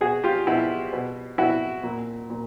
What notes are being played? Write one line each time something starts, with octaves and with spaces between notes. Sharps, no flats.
B2 F#4 G#4
F4 G4
B2 E4 F#4
B2
B2 E4 F#4
A#2
A#2